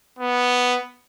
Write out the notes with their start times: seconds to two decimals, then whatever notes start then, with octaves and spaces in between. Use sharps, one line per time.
0.19 B3